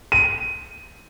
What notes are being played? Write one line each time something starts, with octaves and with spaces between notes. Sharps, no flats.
D#7